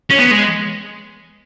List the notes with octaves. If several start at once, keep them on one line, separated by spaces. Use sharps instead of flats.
C#4
B3
G#3